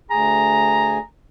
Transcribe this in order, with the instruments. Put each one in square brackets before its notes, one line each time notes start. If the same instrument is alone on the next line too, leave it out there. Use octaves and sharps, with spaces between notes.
[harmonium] D2 G#4 G#5 [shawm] A#5